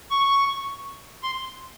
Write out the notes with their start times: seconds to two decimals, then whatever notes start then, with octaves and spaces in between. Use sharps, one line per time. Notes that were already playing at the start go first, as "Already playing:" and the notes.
0.10 C#6
1.23 C6